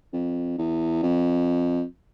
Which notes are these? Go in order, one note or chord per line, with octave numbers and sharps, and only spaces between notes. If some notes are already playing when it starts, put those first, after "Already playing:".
F2
E2
F2